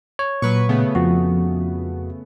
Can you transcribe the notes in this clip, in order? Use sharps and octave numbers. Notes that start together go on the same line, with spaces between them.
C#5
A#2 F#3 B4 C#6
C#3 A3 B3
F2 F3 F#4